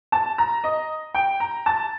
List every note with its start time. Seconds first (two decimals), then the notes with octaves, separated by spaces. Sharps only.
0.12 A5
0.38 A#5
0.64 D#5
1.14 G5
1.40 A#5
1.66 A5